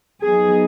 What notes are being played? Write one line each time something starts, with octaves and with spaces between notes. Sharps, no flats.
F#3 B3 D#4 G#4